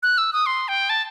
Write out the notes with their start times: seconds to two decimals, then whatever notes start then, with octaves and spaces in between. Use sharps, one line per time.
0.03 F#6
0.18 E6
0.33 D#6
0.46 C6
0.68 G5
0.89 A5